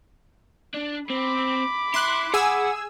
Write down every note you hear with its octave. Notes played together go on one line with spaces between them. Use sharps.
D4
C4 B5 D6
E4 C6 F#6
G#4 F#5 G#5 E6